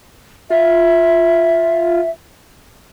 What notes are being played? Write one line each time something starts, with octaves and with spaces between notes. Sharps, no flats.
F4 E5